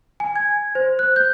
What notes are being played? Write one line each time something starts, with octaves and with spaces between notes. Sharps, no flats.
G#5
G#6
C5
F#6
G6